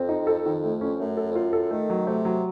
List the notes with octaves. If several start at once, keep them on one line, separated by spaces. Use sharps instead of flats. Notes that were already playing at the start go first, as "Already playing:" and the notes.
Already playing: F2 C4
D#4
A4
D#3
A3
C#4
F#2 A3
A4
F2
F#2 F4
A4
D#3 A3
F#3
C3 A3
F#3